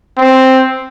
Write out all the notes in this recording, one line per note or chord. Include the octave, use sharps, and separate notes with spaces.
C4